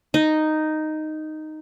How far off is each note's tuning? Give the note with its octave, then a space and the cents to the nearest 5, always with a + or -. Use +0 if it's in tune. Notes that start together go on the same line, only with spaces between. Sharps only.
D#4 -5